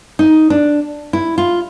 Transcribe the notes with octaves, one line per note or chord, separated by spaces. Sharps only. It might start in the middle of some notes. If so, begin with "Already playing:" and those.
D#4
D4
E4
F4